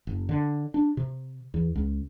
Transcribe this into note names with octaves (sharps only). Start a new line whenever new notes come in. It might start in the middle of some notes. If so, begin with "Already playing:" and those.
F#1
D3
D4
C3
E2
C#2